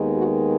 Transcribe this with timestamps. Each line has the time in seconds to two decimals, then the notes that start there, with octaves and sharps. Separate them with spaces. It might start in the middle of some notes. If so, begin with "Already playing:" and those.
Already playing: D#2 D#3 G#3 B3
0.17 F#4